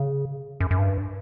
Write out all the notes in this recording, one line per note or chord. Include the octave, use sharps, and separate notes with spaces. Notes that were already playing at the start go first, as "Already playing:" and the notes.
Already playing: C#3
F#2
F#2
G2